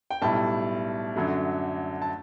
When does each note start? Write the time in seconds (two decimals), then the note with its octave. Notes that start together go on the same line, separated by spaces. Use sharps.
0.10 G5
0.22 B1 A2 G3 A5
1.15 F#2 D3 F#3 A3
2.02 A5